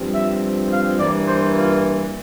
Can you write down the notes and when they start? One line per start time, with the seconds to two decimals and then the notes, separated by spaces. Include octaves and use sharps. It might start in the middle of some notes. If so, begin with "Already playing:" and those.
Already playing: G2 F3 C4
0.13 E5
0.70 F5
0.99 G2 E3 A#3 D5
1.28 C5
1.56 F4